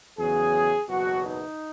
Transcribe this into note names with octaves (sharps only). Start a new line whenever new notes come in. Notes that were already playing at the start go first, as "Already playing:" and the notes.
E2 C#3 F#3 G#4
F#1 E2 B2 F#3 F#4
D#4